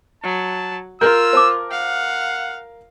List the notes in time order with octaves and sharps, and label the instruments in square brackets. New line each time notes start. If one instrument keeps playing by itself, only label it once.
[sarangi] F#3 [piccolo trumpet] A5
[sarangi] F4 [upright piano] A#4 G6 [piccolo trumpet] E6
[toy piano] C5 A5 D6
[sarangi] F5 [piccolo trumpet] F#5